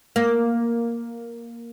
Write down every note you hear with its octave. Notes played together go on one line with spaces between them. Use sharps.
A#3